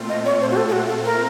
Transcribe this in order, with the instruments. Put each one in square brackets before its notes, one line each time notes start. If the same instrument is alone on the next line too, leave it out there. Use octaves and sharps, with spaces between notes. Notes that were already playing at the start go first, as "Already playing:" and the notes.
Already playing: [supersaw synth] A#2 A3 C4 F4
[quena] D#5
C#5
C5
F#4
A4
A4
F#4
A4
A#4